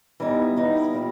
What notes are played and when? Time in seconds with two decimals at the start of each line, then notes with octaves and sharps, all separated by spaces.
0.20 E3 G3 B3 D#4
0.56 E3 G3 B3 D#4
0.93 A#2 G3